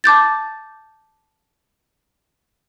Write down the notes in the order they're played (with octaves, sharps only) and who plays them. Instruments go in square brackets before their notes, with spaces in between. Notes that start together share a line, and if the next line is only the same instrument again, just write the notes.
[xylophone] A5 D6 G6 A6